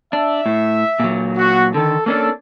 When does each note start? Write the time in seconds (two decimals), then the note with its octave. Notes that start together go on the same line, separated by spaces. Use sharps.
0.13 D4 E5
0.46 A2
1.00 A#2 F#3
1.38 F#4
1.74 D3 D#3 A4
2.06 A#3 C#4 D4 A4